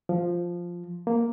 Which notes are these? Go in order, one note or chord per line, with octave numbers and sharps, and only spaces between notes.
F3
A#3